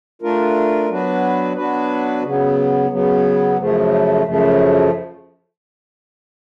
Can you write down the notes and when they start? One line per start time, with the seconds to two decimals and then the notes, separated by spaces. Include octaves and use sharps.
0.22 A3 D4 F4 A#4
0.89 F#3 B3 D4 F#4 B4
1.56 F#3 B3 D4 F#4 B4
2.23 C#3 F#3 B3
2.90 C#3 F#3 B3
3.57 F#2 C#3 F3 A3
4.25 F#2 C#3 F3 A3